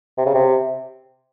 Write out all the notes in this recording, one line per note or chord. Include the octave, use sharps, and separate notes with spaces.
C3
C#3
C3